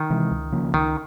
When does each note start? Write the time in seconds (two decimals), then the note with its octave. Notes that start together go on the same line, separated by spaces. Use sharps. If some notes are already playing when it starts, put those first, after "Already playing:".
Already playing: D#3
0.10 C3 E3 G#3
0.31 C#2
0.52 C#3 F3 A#3
0.73 C#2 D#3